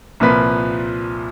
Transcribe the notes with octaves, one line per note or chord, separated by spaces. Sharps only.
C2 A#2 F3 B4 B6